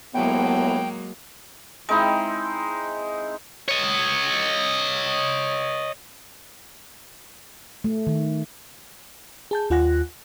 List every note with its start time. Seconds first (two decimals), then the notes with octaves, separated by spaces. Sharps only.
0.14 C2 A2 F#3 G#3 A#3 B3 G5
1.89 G#3 C4 D#4 E4
3.69 C#5 D#5
7.84 A3
8.07 D#3
9.51 G#4 A5 G6
9.70 D#2 F4 F#5 G#5 F#6 A#6